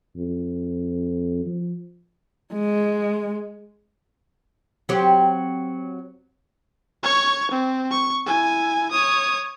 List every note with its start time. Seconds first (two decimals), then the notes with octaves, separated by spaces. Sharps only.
0.16 F2
1.46 F3
2.53 G#3
4.89 F#3 C4 G4
7.03 C#5 C#6
7.50 C4
7.91 C#6
8.26 E4 G#5
8.91 C#5 D#6